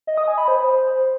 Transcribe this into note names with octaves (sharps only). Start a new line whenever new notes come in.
D#5
D#6
G#5
B5
C5